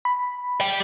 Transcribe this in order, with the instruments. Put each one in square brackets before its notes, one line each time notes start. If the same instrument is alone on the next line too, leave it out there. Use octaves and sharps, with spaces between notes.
[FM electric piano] B5
[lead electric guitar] G3 G5